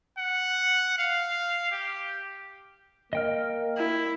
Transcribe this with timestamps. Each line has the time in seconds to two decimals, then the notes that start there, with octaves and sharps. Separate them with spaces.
0.18 F#5
0.98 F5
1.71 G4
3.13 A#3 D#5 G5 F6
3.77 E4